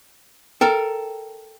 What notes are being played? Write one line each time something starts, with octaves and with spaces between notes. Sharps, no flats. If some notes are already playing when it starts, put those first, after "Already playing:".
A4 A#4 G5